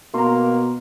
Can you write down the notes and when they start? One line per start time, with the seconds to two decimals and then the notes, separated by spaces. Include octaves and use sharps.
0.14 B2 A#3 A#5 C6